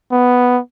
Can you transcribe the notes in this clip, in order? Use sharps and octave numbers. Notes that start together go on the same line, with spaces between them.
B3